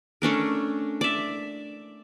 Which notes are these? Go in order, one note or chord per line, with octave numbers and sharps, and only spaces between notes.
A3 C#4 D4 A#4
D5 E5